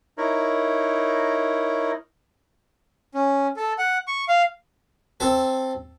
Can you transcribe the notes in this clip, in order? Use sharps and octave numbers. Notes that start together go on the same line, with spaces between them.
D#4 E4 A#4 C#5
C#4
A4
F#5
C#6
F5
C4 A4